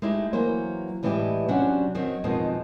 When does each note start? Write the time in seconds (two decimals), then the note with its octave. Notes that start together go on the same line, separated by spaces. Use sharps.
0.02 G#3 A3 D#4 E4 G4
0.33 E3 F#3 A#3 C5
1.03 A2 E3 G3 G#3 E4 G4
1.48 C3 F#3 C#4 D4 F#4 F#5
1.95 D#3 F#3 C4
2.24 F2 B2 D#3 G#3 B3